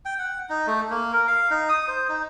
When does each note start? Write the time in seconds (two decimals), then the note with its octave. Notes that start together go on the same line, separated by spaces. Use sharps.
0.05 G5
0.19 F#5
0.49 D#4
0.67 A3
0.90 A#3
1.12 A#4
1.27 F5
1.50 D#4
1.69 D#6
1.88 C5
2.09 D#4